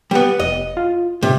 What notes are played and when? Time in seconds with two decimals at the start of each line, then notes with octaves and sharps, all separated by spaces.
0.11 G3 B3
0.40 F1 D#5
0.77 F4
1.23 G#2 C3